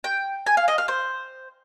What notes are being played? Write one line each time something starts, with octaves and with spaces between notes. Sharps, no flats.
G5
G#5
F5
D#5
F5
C5